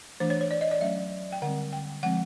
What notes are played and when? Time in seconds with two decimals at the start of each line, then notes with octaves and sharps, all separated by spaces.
0.20 E3 A3 D4 C5
0.30 C#5
0.41 C#5
0.51 D5
0.61 D#5
0.71 D5
0.81 F#3 A3 C#4 E5
1.32 G5
1.42 D3 G3 C4 F#5
1.73 G5
2.03 F3 G#3 C4 F#5